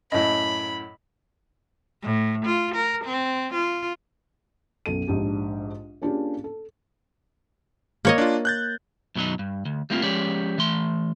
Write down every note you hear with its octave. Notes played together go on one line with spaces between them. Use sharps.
F#2 A2 D#5 B5
A2
F4
A#4
C4
F4
B1 F#2 A4 D#7
A#1 G#2 D4 G4
A#3 C#4 D4 F4 G4 G#4
A4
A#3 C#5 D#5
D4 F4
F#6 G6 A6
F#2 B2 E3 F#3 D#4
G2
D2
G3 A3 A#3 C4 D#4 F4
F3 G#3 C#4 G4 C#5 D5
E3 A3 C6